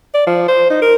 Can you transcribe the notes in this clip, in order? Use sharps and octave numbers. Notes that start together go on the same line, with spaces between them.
D5
F3
C5
D#4
A#4